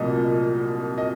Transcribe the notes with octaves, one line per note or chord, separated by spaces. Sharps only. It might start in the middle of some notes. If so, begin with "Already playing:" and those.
Already playing: C2 A#2 F#3 A3 D#5
D#5